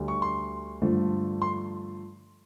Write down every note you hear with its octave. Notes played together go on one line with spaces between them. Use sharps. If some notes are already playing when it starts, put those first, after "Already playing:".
Already playing: D2 D3 G3
C#6
C6
G2 D3 F3 A3
C6